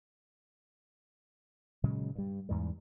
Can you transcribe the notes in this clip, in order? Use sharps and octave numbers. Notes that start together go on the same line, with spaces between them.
A#2 C#3 F#3 G#3
G2 G3
E2 G#2 E3 G3